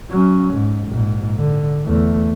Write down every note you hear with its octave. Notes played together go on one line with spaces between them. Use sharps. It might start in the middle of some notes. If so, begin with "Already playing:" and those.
F#3 C#4
G#2
A#1 G#2
D3
E2 A3